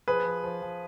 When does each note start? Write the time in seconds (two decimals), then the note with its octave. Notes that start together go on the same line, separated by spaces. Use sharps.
0.08 F3 G#4 B4
0.25 F3
0.44 F3
0.62 F3